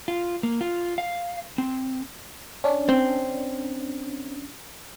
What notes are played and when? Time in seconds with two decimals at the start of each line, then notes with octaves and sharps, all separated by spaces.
0.08 F4
0.43 A#3
0.61 F4
0.98 F5
1.58 C4
2.64 C#4 D4
2.89 C4